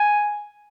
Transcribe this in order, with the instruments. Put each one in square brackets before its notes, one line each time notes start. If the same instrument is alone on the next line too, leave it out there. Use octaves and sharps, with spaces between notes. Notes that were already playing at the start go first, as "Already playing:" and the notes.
Already playing: [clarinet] G#5